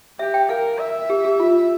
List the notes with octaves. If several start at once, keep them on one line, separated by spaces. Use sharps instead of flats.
G4 E5
G5
A#4 F5
E5
G4
G4
F4